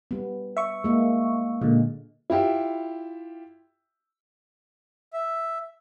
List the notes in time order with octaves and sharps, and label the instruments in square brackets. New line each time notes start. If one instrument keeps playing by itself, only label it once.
[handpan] G3 B3
[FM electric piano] E5 C#6
[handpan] G#3 A#3
[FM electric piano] A#2 D3 [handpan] G#3
[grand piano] E4 F4 G4 E5
[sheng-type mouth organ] E5